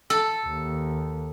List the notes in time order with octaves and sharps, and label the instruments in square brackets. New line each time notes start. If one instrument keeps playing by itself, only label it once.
[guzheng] A4
[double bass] D#2